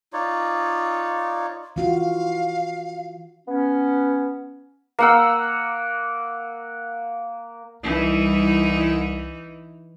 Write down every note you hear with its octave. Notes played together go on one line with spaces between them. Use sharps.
D#4 F4 C#5 D5
E3 F4 F#4 F5
B3 C#4
A#3 F#5 E6
C2 E3 D#4